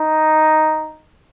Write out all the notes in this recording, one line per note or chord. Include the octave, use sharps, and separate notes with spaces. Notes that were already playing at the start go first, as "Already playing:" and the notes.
Already playing: D#4